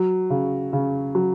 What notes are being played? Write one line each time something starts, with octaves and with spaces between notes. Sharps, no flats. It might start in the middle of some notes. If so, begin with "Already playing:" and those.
Already playing: F#3
C#3
C#3
F#3